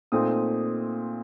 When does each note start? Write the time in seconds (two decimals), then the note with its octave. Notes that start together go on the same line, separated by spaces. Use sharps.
0.12 A#2 A3 C4 D#4 D#6